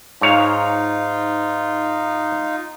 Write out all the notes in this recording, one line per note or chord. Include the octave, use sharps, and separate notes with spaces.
G#2 D#4 F4 C#5 F5